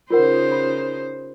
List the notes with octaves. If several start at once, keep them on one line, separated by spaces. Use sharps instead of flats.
C#3 D#4 F4 A#4 C5 F#5
B5